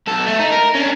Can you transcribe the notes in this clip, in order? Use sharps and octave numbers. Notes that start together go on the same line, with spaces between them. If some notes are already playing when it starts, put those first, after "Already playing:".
B1 A4
A3
D#4
A#4
C#4 D4